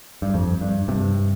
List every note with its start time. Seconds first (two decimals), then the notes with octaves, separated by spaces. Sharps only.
0.22 G2
0.34 F2
0.61 G2
0.88 G2 C3